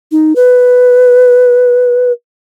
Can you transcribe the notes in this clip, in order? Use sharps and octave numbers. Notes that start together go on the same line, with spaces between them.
D#4
B4